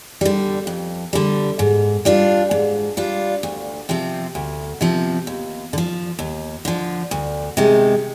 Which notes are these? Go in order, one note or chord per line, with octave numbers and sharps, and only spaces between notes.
D3 G3
F2
D3 G3
G#2
G3 D4 F4
G#2
G3 D4 F4
D2
C3 F3 C4
D2
C3 F3 C4
D#2
D3
F3
D#2
D3 F3
D2
C3 D#3 G#3